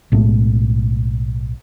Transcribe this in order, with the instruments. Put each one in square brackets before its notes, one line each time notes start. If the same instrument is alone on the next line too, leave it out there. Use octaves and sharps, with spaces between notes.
[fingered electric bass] B1 A2 G#3 A3